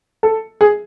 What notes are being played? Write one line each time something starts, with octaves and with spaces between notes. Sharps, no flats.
A4
G#4